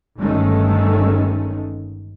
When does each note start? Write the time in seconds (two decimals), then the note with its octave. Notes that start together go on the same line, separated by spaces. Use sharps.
0.18 G1 G2 D#3 G#3 A3 C#4